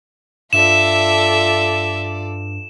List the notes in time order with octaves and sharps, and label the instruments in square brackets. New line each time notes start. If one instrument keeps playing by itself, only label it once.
[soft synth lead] G2 [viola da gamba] F4 A4 D5 [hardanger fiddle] E5 [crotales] E7